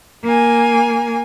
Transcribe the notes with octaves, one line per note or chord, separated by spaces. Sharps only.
A#3 G#5